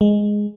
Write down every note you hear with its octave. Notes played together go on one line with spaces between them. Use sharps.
G#3